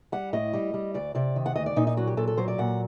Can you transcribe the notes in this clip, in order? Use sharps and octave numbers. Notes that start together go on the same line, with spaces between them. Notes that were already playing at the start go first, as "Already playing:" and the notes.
G3 F#5
A2 D#5
G3
G3
D2 D5
C3 D5
D#3
F#5
D2 D#5
D5
A#2 D#4
D#4
F#3 F#4
G4
A#2 A4
A4
F#3 C5
D5
A#2 F#5